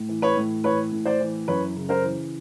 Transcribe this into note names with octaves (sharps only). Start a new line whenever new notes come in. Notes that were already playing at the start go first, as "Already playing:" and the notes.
Already playing: A2
E3
B4 C#5
A2
E3 B4 C#5
A2
C5 D5
E3
F#2 B4 C#5
C#3
A#4 C5
E3